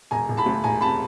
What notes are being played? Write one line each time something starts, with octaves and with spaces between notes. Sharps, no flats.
E1 G#5 A#5
E1
A5 B5
D2
E1 G#5 A#5
C3 A5 B5